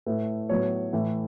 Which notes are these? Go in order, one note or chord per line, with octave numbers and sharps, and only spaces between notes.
A2 A3 B4
A2 F#3 B3 C#5
A2 E3 A3